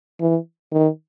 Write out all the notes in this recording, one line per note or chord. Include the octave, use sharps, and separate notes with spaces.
E3
D#3